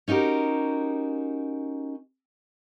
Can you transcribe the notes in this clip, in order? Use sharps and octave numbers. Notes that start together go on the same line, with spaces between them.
C#4 D#4 F#4 G4 A#4